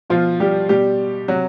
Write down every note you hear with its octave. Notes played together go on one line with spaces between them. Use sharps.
B2 F3 F4
G3 G4
B2 G3 G4
C3 F#3 F#4